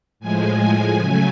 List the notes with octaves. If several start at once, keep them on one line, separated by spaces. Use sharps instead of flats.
A2 F3 G#3 G#5
G#5
C#3 F#3 A3 G#5